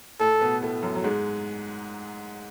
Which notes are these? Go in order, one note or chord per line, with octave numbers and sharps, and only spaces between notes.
A2 A3 A4
B2 B3
A2 A3
F#2 F#3
F#3
G#2 G#3